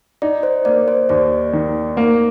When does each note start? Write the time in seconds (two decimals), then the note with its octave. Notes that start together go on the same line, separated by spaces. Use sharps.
0.22 D#4 D5
0.43 C5
0.65 A#3 D5
0.88 C5
1.09 D#2 D5
1.53 D#3
1.97 A#3